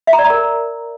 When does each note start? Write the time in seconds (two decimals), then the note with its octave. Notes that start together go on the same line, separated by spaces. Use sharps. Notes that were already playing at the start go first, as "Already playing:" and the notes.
0.07 E5
0.13 A#5
0.19 D5
0.24 A#5
0.30 A#4